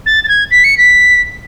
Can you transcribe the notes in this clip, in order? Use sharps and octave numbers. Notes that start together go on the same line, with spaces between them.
A6
A6
G#6
B6
C#7
B6